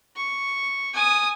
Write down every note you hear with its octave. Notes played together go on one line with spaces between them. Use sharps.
C#6
G#5 D#6